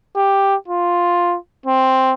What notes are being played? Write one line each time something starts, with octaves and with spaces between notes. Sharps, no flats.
G4
F4
C4